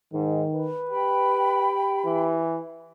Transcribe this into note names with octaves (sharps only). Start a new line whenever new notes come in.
G#2 D#3
B4
G4 G5 B5
E3